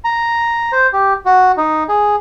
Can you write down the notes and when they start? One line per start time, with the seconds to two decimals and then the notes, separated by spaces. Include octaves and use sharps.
0.04 A#5
0.72 C5
0.93 G4
1.25 F#4
1.57 D#4
1.88 G#4